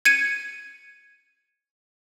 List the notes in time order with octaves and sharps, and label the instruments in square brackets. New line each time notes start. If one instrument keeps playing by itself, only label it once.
[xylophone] G#6 C#7 D#7